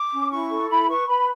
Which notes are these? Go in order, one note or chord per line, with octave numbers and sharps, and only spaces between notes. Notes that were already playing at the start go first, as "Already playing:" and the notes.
Already playing: D6
C#4
E4 C#6
A4
E4 B5
B4 C#6
B4 B5